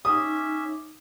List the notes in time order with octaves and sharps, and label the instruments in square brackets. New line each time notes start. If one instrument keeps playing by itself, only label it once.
[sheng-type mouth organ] C#4 E5 [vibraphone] D#4 D6 [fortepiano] D#6